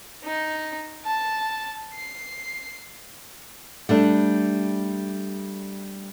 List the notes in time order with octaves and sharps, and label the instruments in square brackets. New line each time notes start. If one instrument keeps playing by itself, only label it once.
[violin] D#4
A5
C7
[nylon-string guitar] G3 A3 D4